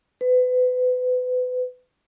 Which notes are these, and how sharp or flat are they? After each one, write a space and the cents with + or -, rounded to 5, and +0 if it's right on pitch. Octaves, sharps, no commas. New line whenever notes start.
B4 +30